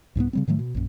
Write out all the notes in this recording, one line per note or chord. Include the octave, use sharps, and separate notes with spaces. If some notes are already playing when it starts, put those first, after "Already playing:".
C2 G#2 F#3 B3
C#3 G3 C4
A2 D#3 F#3 A3
B2
A#1 F#2